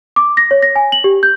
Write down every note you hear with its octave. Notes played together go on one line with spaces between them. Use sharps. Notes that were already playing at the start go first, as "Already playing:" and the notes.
D6
A#6
C#5
A#6
G#5
F#7
G4
G6